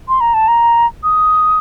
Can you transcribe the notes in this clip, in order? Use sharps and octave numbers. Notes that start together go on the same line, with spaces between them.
C6
A#5
A5
A#5
D#6